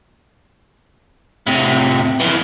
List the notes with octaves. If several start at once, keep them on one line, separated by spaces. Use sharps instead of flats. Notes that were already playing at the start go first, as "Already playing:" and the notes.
A2 C3
F2 E3